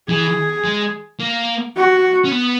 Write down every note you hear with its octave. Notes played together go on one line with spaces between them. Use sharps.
E3 G#4
G#3
A#3
F#4
C#4
B3